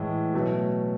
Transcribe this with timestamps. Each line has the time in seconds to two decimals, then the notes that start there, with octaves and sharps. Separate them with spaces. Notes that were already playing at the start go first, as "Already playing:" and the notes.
Already playing: A2 E3 G#3
0.34 B2 F#3 A3